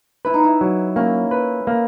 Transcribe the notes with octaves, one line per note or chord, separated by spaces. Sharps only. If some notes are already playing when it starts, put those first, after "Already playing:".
E4 B4
D#4
E4
F#3
A#3 C#4
B4
A#3